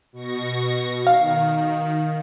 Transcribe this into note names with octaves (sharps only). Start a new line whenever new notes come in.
B2 C#6 A#6
D#3 F5